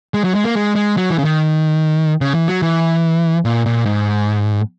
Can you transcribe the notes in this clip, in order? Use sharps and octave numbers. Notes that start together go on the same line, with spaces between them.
G#3
F#3
G#3
A#3
G#3
G#3
F#3
E3
C#3
D#3
C#3
E3
F#3
E3
A#2
A#2
G#2